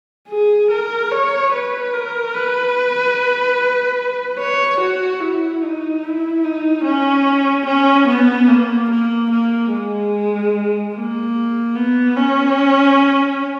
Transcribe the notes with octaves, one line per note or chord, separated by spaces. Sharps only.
G#4
A#4
C#5
B4
A#4
B4
C#5
F#4
E4
D#4
E4
D#4
C#4
C#4
B3
A#3
A#3
A#3
G#3
A#3
B3
C#4